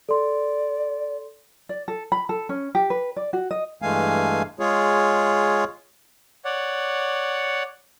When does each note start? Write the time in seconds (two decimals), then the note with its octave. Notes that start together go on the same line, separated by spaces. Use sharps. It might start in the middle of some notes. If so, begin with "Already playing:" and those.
0.09 A4 D5 C6
1.69 D5
1.88 A4
2.12 B5
2.29 A4
2.49 C#4
2.75 G4
2.90 B4
3.17 D5
3.33 F#4
3.51 D#5
3.82 G2 E3 G#3 A3 F5 G#5
4.59 G#3 F4 G#4 C#5
6.45 C#5 D5 F#5